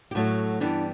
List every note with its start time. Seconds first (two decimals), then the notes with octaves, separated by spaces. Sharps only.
0.11 G4
0.15 A2 F#3 A3 F#4
0.60 G2 E3 G3 B3 D4